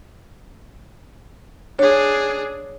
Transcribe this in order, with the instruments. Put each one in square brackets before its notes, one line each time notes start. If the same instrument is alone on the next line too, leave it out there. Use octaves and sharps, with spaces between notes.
[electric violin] D4 G#4 [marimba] C#5